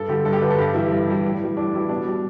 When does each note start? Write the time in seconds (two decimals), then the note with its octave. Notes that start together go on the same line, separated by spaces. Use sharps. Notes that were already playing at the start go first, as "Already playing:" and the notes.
Already playing: G2 A4
0.08 D3 G3 G4
0.25 G2 A4
0.33 G4
0.41 D3 G3 B4
0.50 A4
0.59 G2 G4
0.74 E3 G3 E4
0.92 G2
1.07 E3 G3
1.24 A2
1.40 E3 G3
1.57 A2 D4
1.74 E3 G3 E4
1.89 B2 D4
2.07 G3